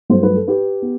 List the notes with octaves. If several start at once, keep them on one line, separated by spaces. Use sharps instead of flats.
G2 F#3 A3 C5
B4
A4
G4 B4
B3